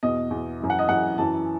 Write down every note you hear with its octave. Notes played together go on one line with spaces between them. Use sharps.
E2 B2 D#5
E2 B2
F#2 E3
F#5
D#5
F#2 E3 F#5
F#2 E3 A5